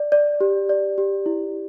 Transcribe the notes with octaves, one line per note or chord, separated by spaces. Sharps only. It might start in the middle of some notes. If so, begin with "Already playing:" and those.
Already playing: D5
D5
G4
D5
G4
E4